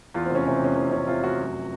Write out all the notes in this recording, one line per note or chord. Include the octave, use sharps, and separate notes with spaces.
E2 F4
C4
F1 C#4
C3 C#4
C4
F1 C#4
E2 C4
F1 C#4
C3 F4
F1 F#4
F#2